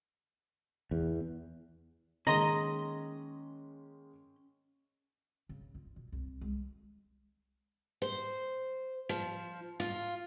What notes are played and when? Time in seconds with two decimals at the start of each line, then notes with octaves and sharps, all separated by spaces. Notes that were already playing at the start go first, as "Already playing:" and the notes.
0.91 E2
2.27 D#3 G#3 A#3 C#4 D#5 A#5 C6 A#6
5.49 C#3
5.75 F4
5.96 B2
6.12 C2
6.41 G#3
8.02 C5
9.09 F3
9.80 F4